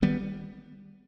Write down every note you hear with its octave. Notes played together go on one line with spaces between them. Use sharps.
D#3 G3 B3